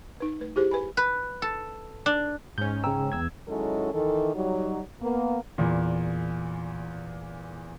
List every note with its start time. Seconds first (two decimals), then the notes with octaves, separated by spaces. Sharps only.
0.20 D#4 B4
0.41 A3 B4
0.56 E4 G4 G#4 C5
0.71 B4 G#5 B5
0.97 B4
1.42 A4
2.06 D4
2.58 G#2 C#4 G6
2.84 C#3 G5 A#5 E6
3.12 E2 E6 G#6
3.48 D#3 F#3 G#3 C#4 E4 A4
3.93 D#3 E3 A4
4.35 F#3 G3 D#4
5.01 A#3 B3
5.58 E2 A#2